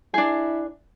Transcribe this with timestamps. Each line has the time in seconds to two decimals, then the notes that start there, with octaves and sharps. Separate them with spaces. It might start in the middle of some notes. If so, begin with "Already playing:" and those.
0.14 D4 E4 G#4